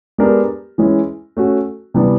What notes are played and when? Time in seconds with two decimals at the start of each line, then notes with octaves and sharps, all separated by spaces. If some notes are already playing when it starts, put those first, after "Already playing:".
0.18 G#3 B3 D4 G4 A#4
0.78 E3 G#3 C#4 E4
1.37 A3 C#4 F#4
1.94 C3 E3 G3 B3 D4